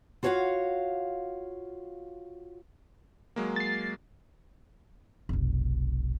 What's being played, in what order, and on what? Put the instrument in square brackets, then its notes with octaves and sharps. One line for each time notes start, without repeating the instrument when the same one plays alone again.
[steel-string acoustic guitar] F4 F#4 C#5 D5 F5 F#5
[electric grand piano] F#3 G#3 A#3
[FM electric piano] A6 C7
[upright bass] F1 B1